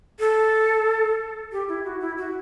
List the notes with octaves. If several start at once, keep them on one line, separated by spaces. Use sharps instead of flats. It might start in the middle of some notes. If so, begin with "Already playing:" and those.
A4
G4
E4
F#4
E4
F#4